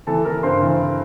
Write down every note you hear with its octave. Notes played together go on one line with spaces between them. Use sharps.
E3 A4 A5
E3 A#4 A#5
G2 C5 C6
E3